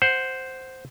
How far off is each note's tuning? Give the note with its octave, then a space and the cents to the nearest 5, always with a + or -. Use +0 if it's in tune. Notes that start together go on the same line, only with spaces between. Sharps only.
C5 +0 F#5 +0